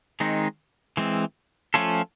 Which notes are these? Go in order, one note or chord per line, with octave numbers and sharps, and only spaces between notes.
D#3 G#3 C4 D#4
E3 G#3 C4
F3 A3 C#4 F4 A4